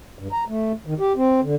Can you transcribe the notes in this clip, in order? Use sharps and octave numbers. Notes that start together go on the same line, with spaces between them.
G2
A#5
A3
D#3
G4
C4
D3